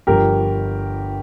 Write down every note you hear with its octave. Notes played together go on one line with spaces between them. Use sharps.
G1 G2 F3 G4 A#4